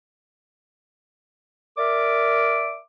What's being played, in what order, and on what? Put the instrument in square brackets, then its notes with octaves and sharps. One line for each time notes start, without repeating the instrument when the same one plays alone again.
[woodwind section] A#4 D5 E5 D6